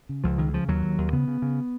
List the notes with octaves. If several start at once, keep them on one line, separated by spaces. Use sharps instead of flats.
C#3
C#2 F3
C#2 D#3
C#3 F3
D#2 F#3
D#2
D#2
C#3 B3
C#3
C#3